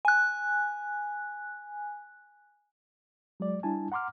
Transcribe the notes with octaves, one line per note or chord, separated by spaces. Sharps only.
G#5 F#6
F#3 G#3 D5
G3 D4 E4 G#5 A5
F#5 A#5 C6 D6 F6